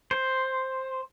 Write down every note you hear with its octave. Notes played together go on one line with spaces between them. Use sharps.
C5